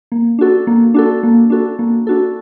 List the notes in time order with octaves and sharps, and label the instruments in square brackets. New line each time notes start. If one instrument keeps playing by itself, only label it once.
[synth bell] A#3
D4 F#4 A4
A#3
D4 F#4 A4
A#3
D4 F#4 A4
A#3
D4 F#4 A4